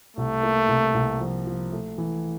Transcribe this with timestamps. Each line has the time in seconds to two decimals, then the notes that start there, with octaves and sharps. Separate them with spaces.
0.17 C2 A3
0.43 A#3
0.69 C2
0.95 C2
1.20 F3
1.47 F3
1.72 A3
1.98 E3